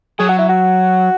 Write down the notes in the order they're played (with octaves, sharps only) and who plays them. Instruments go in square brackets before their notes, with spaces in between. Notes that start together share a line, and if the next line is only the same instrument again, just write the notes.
[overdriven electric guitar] F#3 [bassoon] G#4
[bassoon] F#4
E4
F#4